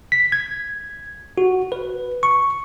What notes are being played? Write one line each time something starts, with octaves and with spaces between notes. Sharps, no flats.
B6
G#6
F#4
B4
C#6